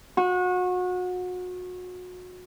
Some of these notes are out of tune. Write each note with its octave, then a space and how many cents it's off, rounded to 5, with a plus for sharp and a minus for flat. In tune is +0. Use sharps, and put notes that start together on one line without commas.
F#4 -30